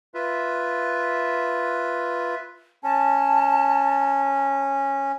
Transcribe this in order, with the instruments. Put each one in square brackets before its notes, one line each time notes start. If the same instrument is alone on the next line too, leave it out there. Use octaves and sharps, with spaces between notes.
[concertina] F4 B4 E5
[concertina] C#4 [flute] A5